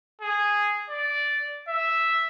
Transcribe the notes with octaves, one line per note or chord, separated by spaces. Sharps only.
G#4
D5
E5